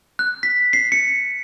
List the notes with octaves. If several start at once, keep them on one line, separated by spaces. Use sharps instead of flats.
F#6
B6
C7
C#7